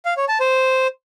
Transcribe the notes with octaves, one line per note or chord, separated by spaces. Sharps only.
F5
C#5
A5
C5